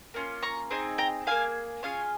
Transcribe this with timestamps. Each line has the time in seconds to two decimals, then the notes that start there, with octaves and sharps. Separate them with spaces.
0.14 A#3 C#4 F4
0.43 A#5 C#6
0.71 C4 D#4 G#4
0.98 G5 A#5
1.27 A#3 F4 G#4 F5 G#5
1.83 C#4 F4 G#4 C#5 F5